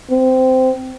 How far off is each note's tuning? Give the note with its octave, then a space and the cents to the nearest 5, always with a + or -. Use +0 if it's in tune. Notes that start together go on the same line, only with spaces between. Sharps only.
C4 -15